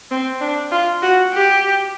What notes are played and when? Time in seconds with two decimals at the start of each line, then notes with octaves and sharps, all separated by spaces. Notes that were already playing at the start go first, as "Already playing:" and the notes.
0.11 C4
0.41 D4
0.71 F4
1.02 F#4
1.33 G4